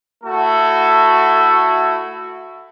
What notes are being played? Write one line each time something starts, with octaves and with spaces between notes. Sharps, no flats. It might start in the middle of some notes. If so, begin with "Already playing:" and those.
A3 E4 F#4 A4